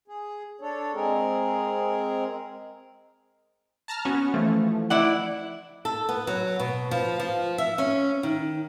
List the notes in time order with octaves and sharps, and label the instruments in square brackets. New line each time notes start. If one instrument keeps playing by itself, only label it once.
[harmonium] G#4
D4 A4 C#5
G#3 C4 G#4 A#4
[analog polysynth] A5 A#5 F6
B3 C#4 F#4
E3 F3 A3
[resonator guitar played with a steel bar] E4 D5 F#5
[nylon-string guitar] A4
B3
F#3
B2
F3
F3
E5
C#4
D#3